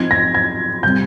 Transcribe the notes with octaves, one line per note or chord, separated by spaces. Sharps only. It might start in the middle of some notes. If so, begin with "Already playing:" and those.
Already playing: F3 C4 D#4 G#6
A#6
G#6
C3 G3 C4 G6